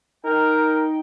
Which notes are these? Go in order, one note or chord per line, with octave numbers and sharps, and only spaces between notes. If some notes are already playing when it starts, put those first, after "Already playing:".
D#4 A#4 G5